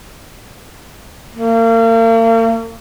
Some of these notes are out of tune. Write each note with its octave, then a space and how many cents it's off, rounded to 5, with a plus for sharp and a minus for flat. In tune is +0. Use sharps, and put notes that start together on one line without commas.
A#3 -40